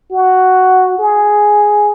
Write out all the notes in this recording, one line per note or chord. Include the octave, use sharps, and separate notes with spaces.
F#4
G#4